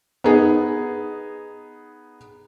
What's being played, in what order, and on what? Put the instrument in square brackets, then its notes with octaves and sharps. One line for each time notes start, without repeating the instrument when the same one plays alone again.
[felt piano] B3 D#4 G#4